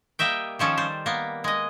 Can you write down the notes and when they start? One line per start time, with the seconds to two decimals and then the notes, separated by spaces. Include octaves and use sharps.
0.19 G3 A#3 D#5 E5 G5
0.59 D#3 F3 C#4 A4
0.77 G3 C5
1.06 A#3 B3
1.44 G#3 D#5